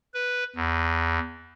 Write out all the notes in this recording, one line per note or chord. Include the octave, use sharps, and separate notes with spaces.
B4
E2